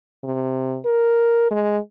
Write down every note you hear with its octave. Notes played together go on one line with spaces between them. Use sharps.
C3
A#4
G#3